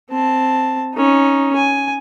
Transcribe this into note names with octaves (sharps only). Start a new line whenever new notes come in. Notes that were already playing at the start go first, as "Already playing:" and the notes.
C4 A5
C#4 D#4
G#5